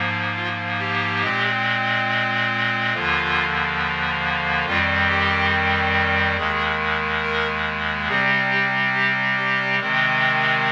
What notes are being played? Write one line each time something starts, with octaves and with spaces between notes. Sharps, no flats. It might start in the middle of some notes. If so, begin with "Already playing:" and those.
Already playing: G#2 F3 A#3
F4
G4
A#2 G#3 C4
D#2 D3 F3 A#3 F4
F2 D#3 G3 C4 F4
G4
D#2 D#3 G#3 G#4
A#4
C3 G3 C4 G#4
G4
G4
G4
C3 D#3 G#3 C4